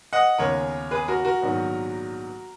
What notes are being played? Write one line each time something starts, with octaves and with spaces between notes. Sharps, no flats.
D#5 F#5
D#2 C#3 G#3 B3 A#4 C#5
G#4 B4
F#4 A#4
F#4 A#4
A#1 G#2 D#3 F#3 B3